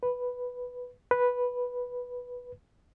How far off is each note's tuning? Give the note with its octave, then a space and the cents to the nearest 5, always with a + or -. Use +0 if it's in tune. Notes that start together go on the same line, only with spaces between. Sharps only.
B4 +0
B4 -5